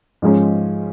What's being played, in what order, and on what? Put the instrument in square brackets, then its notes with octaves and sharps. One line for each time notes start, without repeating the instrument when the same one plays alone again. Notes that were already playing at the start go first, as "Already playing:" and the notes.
[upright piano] G#2 F3 G#3 C#4